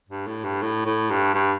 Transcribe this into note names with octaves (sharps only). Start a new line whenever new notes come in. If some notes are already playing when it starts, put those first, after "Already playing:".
G2
A2
G2
A2
A2
G2
G2